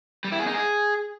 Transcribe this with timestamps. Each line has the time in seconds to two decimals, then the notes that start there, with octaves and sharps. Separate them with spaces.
0.24 G3
0.32 E4
0.39 G#4
0.47 D#4
0.54 G#4